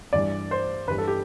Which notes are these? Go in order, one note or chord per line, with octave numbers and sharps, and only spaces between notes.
G2 E3 G3 D5
C5
G2 E3 G3 B4
A4
G4